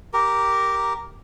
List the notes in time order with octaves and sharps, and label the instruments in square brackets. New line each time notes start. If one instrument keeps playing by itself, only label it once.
[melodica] G4 A#4